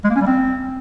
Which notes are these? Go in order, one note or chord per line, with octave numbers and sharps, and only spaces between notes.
G#3
A#3
C#4
G3
C4